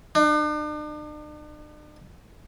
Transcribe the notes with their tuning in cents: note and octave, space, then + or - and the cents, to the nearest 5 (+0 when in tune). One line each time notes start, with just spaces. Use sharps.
D4 +45